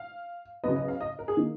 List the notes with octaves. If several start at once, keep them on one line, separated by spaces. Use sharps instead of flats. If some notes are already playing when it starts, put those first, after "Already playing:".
Already playing: F5
C#3 F#3 B3 D#5
D#5
F5
D#5
A#4
G#4
D#3 A#3